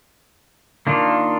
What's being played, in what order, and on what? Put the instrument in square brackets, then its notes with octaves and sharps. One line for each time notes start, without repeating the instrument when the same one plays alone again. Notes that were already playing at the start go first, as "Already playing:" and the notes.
[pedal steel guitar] D#3 A#3 D4 F4